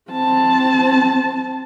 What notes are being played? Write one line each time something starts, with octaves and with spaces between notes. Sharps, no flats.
C4 A5